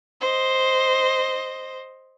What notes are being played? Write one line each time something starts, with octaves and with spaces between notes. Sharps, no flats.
C5 D#5